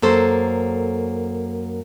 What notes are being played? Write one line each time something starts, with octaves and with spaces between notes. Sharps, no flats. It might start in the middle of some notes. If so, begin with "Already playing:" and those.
F#2 A#3 A4 C5